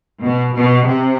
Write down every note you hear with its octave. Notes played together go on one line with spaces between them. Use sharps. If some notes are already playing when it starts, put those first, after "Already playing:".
B2
B2
C3